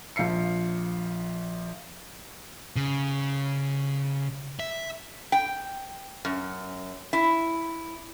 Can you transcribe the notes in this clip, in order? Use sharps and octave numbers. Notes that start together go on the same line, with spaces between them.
A#1 F3 F5 C7 C#7
C#3
E5
G5
F#2
E4